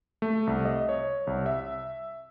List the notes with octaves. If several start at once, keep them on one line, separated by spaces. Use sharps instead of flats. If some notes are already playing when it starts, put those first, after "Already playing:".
A3
C2
D#5
C#5
C2
E5